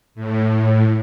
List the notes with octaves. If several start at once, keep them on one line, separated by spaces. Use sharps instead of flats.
A2